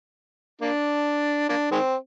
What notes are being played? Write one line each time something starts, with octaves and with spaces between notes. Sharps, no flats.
A#3 D4
A#3 D4
D#3 G#3 C4